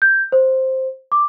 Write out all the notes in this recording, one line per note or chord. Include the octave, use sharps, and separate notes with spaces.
G6
C5
D6